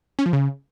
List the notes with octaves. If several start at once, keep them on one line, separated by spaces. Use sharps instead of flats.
C#4
F3
C#3